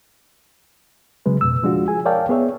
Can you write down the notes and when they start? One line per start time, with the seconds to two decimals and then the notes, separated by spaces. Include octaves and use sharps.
1.26 C#3 F#3 G#3 B4
1.41 F2 B2 E6
1.63 F3 G#3 D4 F4 F#4
1.88 G#4 G#5
2.05 A#4 C#5 D5 F5 G5 A5
2.29 B3 G#4 C#5 E5